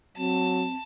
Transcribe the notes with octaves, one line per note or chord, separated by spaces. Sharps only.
F#3 C4 A5